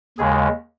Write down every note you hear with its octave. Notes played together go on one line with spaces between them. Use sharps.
D#2 C#3 G#3 G#4